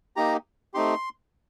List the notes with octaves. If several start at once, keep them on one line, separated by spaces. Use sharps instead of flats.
A#3 D#4 G4 A#5
A3 C4 D#4 G4 C6